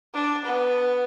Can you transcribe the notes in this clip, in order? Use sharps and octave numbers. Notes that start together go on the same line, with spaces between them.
D4
B3